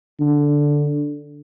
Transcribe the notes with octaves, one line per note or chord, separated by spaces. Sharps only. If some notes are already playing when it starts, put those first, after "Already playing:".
D3